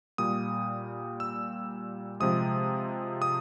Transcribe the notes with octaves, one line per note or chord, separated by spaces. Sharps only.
A#2 G3 D#6
E6
C3 F3 G#3 D#6
D#6